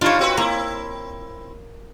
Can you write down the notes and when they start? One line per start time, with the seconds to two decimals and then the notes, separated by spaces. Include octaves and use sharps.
0.01 G2 D4 D#4 F4 C#5
0.19 C4 F#4 B4
0.37 A#3 C4 E4